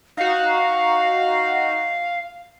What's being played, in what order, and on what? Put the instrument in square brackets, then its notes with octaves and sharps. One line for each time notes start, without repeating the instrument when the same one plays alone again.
[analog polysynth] D#4 F#4 [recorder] F5